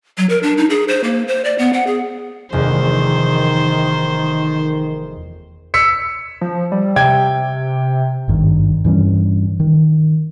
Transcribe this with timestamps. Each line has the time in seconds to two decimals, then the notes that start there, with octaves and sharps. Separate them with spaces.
0.18 F#3
0.29 A#4
0.43 D4
0.58 D#4
0.70 G#4
0.88 C5
1.04 A#3
1.28 C5
1.45 D5
1.58 B3
1.73 F#5
1.87 G#4
2.52 F1 E2 D#3 C5
5.74 E6 B6 C#7
6.41 F3
6.72 G3
6.96 C3 G5 G#6
8.28 G#1 G2 D#3
8.85 G2 E3 G3 C#4
9.60 D#3